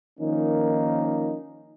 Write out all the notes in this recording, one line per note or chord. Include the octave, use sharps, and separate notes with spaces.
D#3 F3 A#3 C#4 D#4